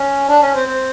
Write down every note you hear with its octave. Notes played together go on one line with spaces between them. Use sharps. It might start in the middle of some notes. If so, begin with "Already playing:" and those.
Already playing: C#4
D4
C#4
C4
C4